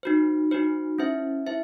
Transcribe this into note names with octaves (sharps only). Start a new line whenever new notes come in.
D#4 F#4 C5
D#4 F#4 C5
C#4 E4 C5 E5
E4 C5 E5